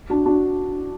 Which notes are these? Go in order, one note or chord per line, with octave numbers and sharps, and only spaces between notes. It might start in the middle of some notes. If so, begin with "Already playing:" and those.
D4 F#4
D4 F#4